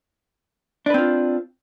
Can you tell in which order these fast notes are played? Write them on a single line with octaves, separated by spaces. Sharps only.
D4 B4 C4 F4